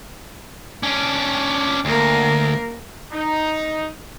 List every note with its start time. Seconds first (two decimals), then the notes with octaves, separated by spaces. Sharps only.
0.83 C#4 D4
1.85 D2 A#3 A#4
3.12 D#4